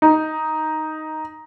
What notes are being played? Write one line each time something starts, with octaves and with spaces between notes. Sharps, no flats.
D#4